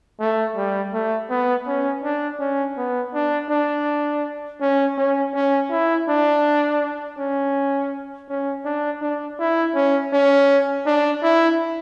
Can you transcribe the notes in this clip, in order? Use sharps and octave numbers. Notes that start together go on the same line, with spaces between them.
A3
G3
A3
B3
C#4
D4
C#4
B3
D4
D4
C#4
C#4
C#4
E4
D4
C#4
C#4
D4
D4
E4
C#4
C#4
D4
E4